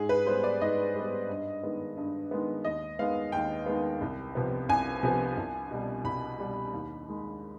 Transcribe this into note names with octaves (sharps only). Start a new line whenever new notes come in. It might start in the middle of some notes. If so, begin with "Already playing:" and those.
Already playing: G#2 G#4
B4
G3 B3 C5
D5
G#2 D#5
G3 B3
G2
D#3 G#3 B3
G2
D#3 G#3 B3
D#2 D#5
D#3 G#3 B3 F5
D#2 G5
D#3 G#3 B3
C2
C3 F3 B3
C2 G#5
C3 F3 B3
C2
B2 G3
C2 B5
B2 G3
D#2
D#3 G#3